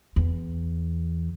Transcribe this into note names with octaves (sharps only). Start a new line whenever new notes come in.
E2